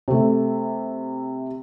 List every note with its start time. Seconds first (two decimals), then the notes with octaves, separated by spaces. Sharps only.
0.08 C3 A3